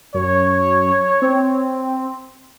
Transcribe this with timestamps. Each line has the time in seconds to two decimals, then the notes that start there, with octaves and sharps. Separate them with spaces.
0.14 F#2 C#5
1.22 C4